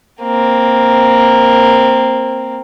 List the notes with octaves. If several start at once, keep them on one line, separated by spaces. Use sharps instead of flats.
A#3 C4